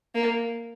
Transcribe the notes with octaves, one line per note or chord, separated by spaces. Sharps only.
A#3